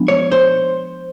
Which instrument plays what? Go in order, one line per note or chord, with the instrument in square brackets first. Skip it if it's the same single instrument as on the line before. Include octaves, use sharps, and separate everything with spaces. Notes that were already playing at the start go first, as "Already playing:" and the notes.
Already playing: [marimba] F3 G#3 B3 D4 F4
[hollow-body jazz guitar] C#5
C5